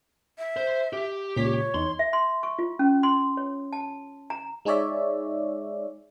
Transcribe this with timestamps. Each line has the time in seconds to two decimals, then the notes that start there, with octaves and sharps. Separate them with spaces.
0.38 E5
0.56 C5
0.93 G4
1.36 C#2 A#2 C#5 B6
1.74 E2 D#4 C6
1.99 E5
2.13 C6
2.43 C#6
2.59 F4
2.79 C#4
3.03 C6
3.37 C#5
3.73 A5
4.30 A#5
4.65 G#3 D#4 G#4 C#5 D5 E5